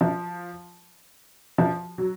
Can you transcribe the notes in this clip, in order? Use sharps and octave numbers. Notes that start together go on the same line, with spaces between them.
F3
F3
F#3